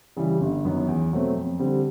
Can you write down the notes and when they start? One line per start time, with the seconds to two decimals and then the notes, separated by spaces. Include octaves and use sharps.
0.16 C#3 E3 G3
0.41 G1
0.65 F#2 D#3 F#3 B3
0.88 E2
1.12 B2 F#3 A3 C4
1.36 F2
1.59 D3 G3 C4